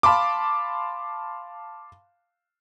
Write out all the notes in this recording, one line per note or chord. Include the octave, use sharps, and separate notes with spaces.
F5 A5 B5 C6 D6